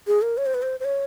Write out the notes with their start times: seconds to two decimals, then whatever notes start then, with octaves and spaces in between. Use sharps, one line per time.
0.07 G#4
0.22 A#4
0.38 C#5
0.46 C5
0.54 B4
0.62 C5
0.80 C5
0.85 C#5